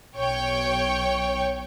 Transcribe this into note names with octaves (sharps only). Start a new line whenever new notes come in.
B1 C#5 G5 C#6